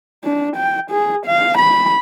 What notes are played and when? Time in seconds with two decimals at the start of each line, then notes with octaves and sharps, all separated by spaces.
0.24 D4
0.56 G5
0.91 G#4
1.26 F5
1.58 B5